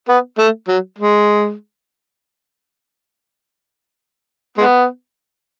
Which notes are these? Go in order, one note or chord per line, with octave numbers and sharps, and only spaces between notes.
B3
A3
F#3
G#3
G#3 B3